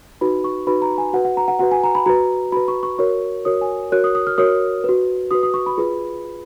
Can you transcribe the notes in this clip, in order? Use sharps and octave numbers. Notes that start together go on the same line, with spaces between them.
D#4 F#4 B4 B5
C#6
D#4 F#4 B4 B5
A#5
G#5
F#4 B4 F#5
F#5
A#5
F#5
F#4 B4 F#5
G#5
A#5
B5
F#4 B4 A#5
F#4 B4 B5
C#6
C#6
F#4 A#4 C#5 C#6
F#4 A#4 C#5 D#6
G#5
F#4 A#4 C#5 F#6
D#6
D#6
F6
F#4 A#4 C#5 D#6
F#4 B4
F#4 B4 D#6
D#6
C#6
B5
F4 G#4 B4